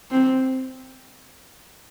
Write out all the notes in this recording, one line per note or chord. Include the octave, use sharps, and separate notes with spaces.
C4